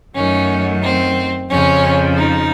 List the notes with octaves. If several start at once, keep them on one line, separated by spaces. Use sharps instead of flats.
F#2 D#3 F#3 A3 C#4
C4
F2 C#3 F3 C#4
D#4